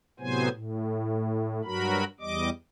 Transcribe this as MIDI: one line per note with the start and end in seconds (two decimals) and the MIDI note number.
0.20 0.49 45
0.20 0.49 48
0.20 0.49 54
0.20 0.49 59
0.20 0.49 72
0.20 0.49 80
0.52 1.61 45
1.64 2.04 43
1.64 2.04 54
1.64 2.04 66
1.64 2.04 70
1.64 2.04 83
2.20 2.50 40
2.20 2.50 55
2.20 2.50 75
2.20 2.50 86